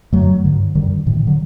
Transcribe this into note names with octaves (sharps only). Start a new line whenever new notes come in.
F#2 D3 F#3 A3
G2 D3
F#2 D3 D#3 G3
A2 D#3
D#3
D3 F#3